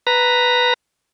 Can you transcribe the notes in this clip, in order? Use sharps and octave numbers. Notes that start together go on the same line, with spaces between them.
B4 A#5